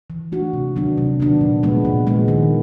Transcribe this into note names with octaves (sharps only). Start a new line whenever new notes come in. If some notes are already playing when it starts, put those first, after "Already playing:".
E3
A3 D4 F#4
C3
D#3 F#3 B3 D4
C3
D#3 F#3 B3 D4
A#2
F3 G#3 B3
A#2
F3 G#3 B3
D#3